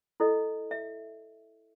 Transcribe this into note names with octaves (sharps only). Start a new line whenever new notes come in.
E4 A4 D#5
E5